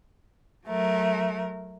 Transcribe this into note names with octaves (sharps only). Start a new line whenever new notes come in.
F#3 A3 A#4